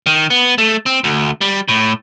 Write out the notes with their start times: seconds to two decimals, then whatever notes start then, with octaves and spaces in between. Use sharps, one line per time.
0.06 D#3
0.30 B3
0.58 A3
0.86 C4
1.04 D2
1.41 G3
1.68 A2